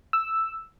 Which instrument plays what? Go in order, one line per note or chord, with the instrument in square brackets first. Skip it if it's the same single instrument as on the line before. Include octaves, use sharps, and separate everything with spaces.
[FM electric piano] E6